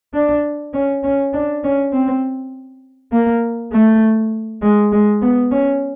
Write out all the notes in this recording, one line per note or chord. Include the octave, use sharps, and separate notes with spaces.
D4
C#4
C#4
D4
C#4
C4
A#3
A3
G#3
G#3
B3
C#4